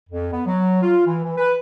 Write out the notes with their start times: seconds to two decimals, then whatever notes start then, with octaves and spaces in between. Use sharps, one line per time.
0.09 F2
0.32 B3
0.45 F#3
0.81 F4
1.06 E3
1.23 E3
1.37 B4